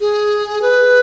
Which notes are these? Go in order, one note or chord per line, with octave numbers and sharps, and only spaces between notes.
G#4
B4